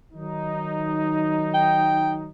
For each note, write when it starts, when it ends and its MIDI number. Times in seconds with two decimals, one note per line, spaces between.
0.13 2.30 51
0.13 2.30 54
0.13 2.30 63
1.54 2.12 79